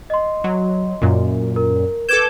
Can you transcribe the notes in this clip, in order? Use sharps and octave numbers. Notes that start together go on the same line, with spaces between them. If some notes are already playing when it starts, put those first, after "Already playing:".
D#5 C6
F#3
F#2 A#2
A#4
A4 B4 D6 G6 G#6 E7